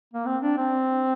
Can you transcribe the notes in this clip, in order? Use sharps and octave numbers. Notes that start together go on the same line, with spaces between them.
A#3
C4
D4
C4